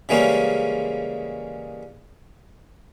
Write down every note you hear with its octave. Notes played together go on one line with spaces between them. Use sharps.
C#3 E3 G3 G#3 A#3 C#4